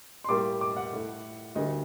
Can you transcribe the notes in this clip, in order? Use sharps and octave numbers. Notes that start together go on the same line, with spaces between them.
C6
A2 G3 A#3 D6
D6
F#5
A2 A3
D2 D3 G3 A#3 D#5